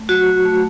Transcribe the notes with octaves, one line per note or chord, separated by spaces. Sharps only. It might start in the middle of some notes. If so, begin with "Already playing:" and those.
Already playing: A3
F#3 F#4
A3